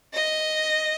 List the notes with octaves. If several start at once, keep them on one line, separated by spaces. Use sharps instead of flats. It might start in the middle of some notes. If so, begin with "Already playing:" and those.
D#5